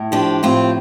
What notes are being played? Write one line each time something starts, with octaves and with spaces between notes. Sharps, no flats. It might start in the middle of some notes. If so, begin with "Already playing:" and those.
Already playing: A2
F3 D4 G4
A2 C4 F4